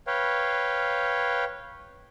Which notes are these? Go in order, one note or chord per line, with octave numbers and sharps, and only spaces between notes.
B4 C#5 F5 G5